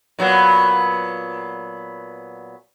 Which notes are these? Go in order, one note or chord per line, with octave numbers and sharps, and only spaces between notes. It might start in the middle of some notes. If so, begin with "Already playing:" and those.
A#2 F#3 B3